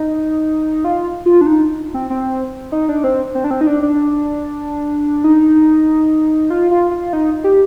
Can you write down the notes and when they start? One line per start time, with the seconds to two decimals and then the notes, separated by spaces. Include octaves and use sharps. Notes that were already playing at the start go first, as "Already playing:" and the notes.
Already playing: D#4
0.84 F4
1.26 F4
1.41 D4
1.46 D#4
1.94 C4
2.10 C4
2.72 D#4
2.89 D4
3.04 C4
3.35 C4
3.44 D4
3.51 C4
3.61 D#4
3.67 D4
3.82 D4
5.24 D#4
6.50 F4
6.71 F4
6.91 F4
7.13 D#4
7.44 G4